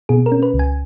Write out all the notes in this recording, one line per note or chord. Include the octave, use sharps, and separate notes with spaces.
B2 G#4
A#4
C#4
B4
C#2
G#5